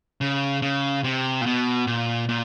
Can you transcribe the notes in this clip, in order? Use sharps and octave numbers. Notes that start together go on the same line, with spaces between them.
C#3
C#3
C3
A#2
B2
A#2
A#2